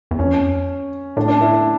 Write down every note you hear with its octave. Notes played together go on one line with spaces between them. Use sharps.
E2
F2 C#4
A2 D4
D4
E4